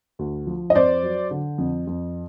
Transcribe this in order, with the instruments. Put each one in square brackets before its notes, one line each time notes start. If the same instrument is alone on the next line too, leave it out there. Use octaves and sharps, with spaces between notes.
[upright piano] D2
F3
D#5
F2 C5 D5
F#3
D3
F2
F2